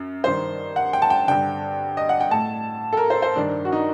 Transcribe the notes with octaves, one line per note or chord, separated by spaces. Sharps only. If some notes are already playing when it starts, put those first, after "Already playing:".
Already playing: F#2
G2 D#3 C5
F#5
G5
A5
G5
G2 D3 G5
D#5
F#5
G5
A2 A5
A4
A#4
C5
C5
G2 D#3 D4
F#4
D#4